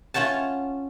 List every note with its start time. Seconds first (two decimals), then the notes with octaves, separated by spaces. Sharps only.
0.14 C#4 F4 C#5 F#5 A5